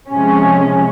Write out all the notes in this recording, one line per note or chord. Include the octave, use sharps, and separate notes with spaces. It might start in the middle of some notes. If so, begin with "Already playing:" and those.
C3 F3 G#3 C#4